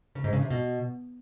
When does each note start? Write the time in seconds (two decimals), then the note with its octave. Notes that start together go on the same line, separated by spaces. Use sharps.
0.15 C#3
0.24 G#2
0.33 C#3
0.42 C3
0.50 B2